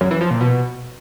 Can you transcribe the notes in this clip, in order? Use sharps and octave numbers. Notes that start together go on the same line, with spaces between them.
F#2
E3
F3
A#2
B2